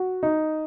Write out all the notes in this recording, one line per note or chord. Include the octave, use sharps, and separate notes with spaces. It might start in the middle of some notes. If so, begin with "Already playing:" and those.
Already playing: F#4
D#4